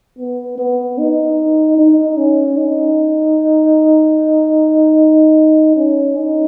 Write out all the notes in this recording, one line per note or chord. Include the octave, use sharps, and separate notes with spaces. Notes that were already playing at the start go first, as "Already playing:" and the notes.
B3
B3
D#4
D#4
C#4
D#4
C#4
D#4